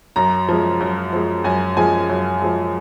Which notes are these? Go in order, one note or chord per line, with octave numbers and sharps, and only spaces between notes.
F#2 A#5
F3 G#3
F#2
F3 G#3
F#2 G#5
F3 G#3 G#5
F#2
F3 G#3